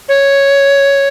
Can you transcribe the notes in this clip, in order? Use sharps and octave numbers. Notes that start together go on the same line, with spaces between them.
C#5